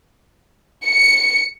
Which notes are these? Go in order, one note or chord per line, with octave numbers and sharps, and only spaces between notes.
C#7